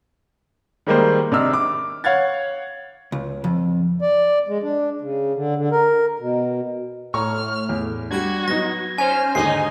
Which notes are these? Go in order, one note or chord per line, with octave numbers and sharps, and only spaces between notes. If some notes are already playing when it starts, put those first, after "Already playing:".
D#3 G3 G#3 A#3 A#4 C5
C3 D4 D#4 E6 F6
D6
C#5 F5 F#5 G#6 A6
C#2
F2
D5
G#3
D4
C#3
D3
D3
A#4
B2
A2 C#5 A#5 C#6 F6
E2
G3 D4 F#4 G#6
F#3 B3 D#4 A#6
C#4 C5 G#5 F6
D#2 G#2 D3 D#4 D#5 G#5 C7